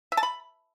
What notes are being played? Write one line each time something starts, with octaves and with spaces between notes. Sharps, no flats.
E5
A5
B5